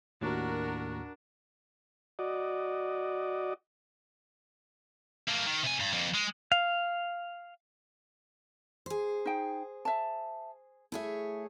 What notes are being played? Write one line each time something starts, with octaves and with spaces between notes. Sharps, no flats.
D#2 A2 D4 F#4 A#4
F#4 D5 D#5
A3 A#3
D#3
C3 G#5
G2
F2 A#3
G#3
F5
G#4 C5
D#4 G5
E5 A5
A3 E4 G#4 C#5 E5